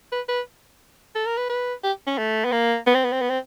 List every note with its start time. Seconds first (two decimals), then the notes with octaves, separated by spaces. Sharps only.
0.12 B4
0.28 B4
1.15 A4
1.26 A#4
1.37 B4
1.50 B4
1.83 G4
2.07 C#4
2.18 A3
2.45 B3
2.52 A#3
2.86 B3
2.95 C4
3.04 B3
3.12 C4
3.21 B3
3.30 C4